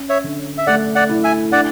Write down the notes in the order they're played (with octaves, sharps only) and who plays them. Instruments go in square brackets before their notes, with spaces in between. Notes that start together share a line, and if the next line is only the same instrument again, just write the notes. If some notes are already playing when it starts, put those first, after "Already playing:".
Already playing: [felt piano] C#4
[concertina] C#5 E5
[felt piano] D3
[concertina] E5
[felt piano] A3 [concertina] D5 F#5
[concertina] D5 F#5
[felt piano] E4
[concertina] E5 G#5
[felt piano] D4 [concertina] D5 F#5